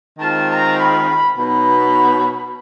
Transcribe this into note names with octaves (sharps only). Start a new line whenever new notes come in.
D#3 G#3 C4 F4 A5
A#5
B5
B2 F#3 B3 D#4 B5